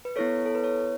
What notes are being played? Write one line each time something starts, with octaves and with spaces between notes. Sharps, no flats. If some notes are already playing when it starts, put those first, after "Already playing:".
B4
B3 E4 A4 C#5
A4
B4
C#5